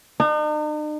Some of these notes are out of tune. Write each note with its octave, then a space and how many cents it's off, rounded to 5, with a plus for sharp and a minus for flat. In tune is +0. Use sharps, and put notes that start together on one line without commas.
D#4 -45